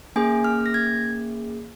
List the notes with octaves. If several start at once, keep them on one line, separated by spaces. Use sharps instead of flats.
A#3 C#4 G#4 G#5
F6
A#6
G#6